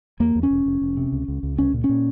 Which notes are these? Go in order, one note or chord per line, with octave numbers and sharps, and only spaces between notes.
E2 A#3
E2
C#4
E1
F1
F1
C3
C#2
C#2
C#2
C2 C#4
A#2
C#4
A#2